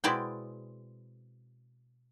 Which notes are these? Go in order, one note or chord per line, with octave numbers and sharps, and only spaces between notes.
B2 G#3 C4 E4 D5 G5